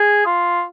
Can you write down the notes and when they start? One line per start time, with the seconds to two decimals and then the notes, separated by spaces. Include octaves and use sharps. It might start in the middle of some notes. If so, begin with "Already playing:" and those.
Already playing: G#4
0.26 F4